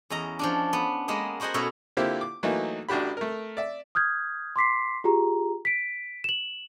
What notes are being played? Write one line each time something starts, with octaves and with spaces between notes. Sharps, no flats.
E2 C#4 D#5 A#5
F3 C#4 D4
B3
G#3 A#3 B3 A#4 D#5
A#3 F#4 C5 D#5 F#5 G#5
B2 A3 C#4 E4 A4 C#5
D3 A#3 C4 E4 F4 G4
D6
E3 F#3 A3 A#3 D#4
A1 D4 F#4 G4 B5
A3 A#4
D5 E5
D#6 F6 G6 G#6
C6 D6 B6 C7
F4 G4 G#4 A#5
B6 D7
E7 F#7